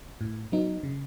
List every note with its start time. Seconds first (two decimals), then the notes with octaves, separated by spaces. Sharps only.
0.21 A2
0.52 F#3 B3 D#4
0.83 C#3